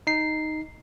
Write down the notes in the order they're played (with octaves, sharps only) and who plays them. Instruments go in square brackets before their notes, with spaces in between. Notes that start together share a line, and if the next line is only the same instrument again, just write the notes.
[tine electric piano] D#4 C7